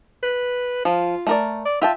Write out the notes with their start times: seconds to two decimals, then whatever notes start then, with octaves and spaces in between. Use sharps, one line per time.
0.23 B4
0.85 F3 F4
1.27 A3 A#4 D5
1.65 D5
1.82 F4 E5 G5 A5